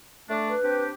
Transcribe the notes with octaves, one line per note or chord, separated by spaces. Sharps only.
A3 D4
B4
C4 D4 G4